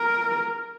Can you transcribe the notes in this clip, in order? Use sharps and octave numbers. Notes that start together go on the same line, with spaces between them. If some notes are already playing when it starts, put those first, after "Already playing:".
Already playing: A#4